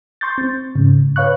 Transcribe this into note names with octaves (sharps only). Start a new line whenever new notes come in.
C6 C#6 G6 A6
C4
G#2 C#3
B4 C#5 F5 C#6 F#6